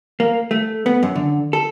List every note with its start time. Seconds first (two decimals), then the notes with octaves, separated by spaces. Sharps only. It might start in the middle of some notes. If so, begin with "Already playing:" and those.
0.20 A#3
0.51 A3
0.86 B3
1.03 F#2
1.15 D3
1.53 A4